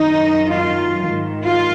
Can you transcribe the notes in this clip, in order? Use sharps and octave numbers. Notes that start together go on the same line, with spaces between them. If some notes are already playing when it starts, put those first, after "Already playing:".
Already playing: F#2 D#3 D#4
F4
G#2 D#3
F4